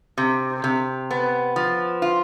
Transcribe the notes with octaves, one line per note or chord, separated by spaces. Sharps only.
C3
C3
B3
F3
F4